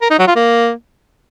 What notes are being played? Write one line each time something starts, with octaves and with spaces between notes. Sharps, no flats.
A#4
D#4
F#3
F4
A#3